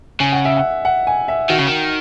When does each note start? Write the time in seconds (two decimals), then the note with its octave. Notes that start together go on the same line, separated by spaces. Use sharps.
0.20 C#3 G#5
0.32 F#5
0.45 E5
0.57 F#5
0.85 F#5
1.07 G#5
1.28 E5
1.49 D#3 F#4
1.59 C#3
1.68 D#3